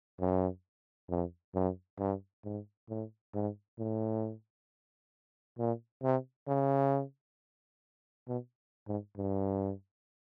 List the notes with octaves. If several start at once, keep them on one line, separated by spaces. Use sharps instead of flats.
F#2
F2
F#2
G2
G#2
A2
G#2
A2
A#2
C3
C#3
B2
G#2
G2